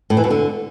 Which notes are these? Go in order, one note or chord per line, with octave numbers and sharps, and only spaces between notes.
A2
E3
B2
D3